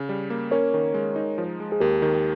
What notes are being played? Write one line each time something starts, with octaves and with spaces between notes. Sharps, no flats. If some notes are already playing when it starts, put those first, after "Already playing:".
Already playing: C#3
G3
A#3
C#4 A#4 C#5
D#3
G#3
D#4
F3
G#3
G#4
D#2 G4 A#4
D#3